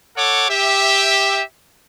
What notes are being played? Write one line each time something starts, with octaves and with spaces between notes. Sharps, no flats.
A4 C#5 F#5 D6
G4 E5